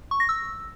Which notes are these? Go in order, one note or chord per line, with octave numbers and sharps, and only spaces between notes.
C#6
A#6
E6